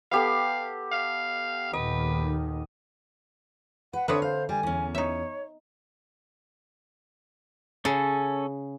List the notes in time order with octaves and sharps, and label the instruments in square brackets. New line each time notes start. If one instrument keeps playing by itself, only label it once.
[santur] B3 G4 A4 [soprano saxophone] F5
[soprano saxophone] F5
[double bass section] D#2 A#2 D#3 [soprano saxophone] B4 [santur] D#5
[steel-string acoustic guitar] B4 [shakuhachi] F#5
[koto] D3 C4 B4 [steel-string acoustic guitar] C#5 E5 [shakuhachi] D#6
[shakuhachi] C5 [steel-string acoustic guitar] F5
[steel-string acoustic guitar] G3 [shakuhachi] G#5
[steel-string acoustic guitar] E2 C#4
[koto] D#4 E5 [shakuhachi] C#5
[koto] C#3 [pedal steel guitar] C#4 A4